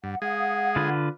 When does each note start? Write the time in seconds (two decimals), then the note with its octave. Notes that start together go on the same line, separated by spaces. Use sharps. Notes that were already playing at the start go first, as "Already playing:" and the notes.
0.04 G2 F#5
0.22 G#3 G#4 F5 F#5 D#6
0.76 D3 F4 B4